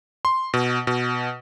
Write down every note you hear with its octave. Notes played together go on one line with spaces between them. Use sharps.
C6
B2
B2